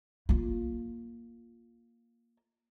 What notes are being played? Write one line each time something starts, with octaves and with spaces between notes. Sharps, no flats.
A#3 F4